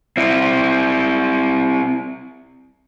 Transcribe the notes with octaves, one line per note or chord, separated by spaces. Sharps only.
C4 E4